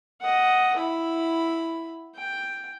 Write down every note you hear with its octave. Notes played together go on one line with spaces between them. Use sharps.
D#5 F#5
E4 B5
G5